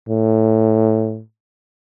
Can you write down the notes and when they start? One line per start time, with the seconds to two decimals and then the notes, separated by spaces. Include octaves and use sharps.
0.09 A2